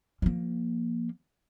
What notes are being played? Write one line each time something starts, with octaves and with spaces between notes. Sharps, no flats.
F3 A#3